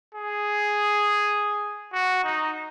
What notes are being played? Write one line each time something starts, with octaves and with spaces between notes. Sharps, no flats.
G#4
F#4
D#4